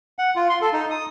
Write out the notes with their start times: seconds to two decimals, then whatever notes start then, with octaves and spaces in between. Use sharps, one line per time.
0.19 F#5
0.36 F4
0.50 C6
0.61 A4
0.73 D#4
0.90 D#6